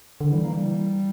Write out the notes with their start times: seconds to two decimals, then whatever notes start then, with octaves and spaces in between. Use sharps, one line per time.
0.21 D3
0.32 E3 G3
0.43 A#3
0.54 G3